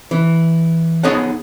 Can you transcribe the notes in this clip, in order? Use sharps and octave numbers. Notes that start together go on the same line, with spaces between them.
E3
B3 D#4 G#4 C#5 E5 F#5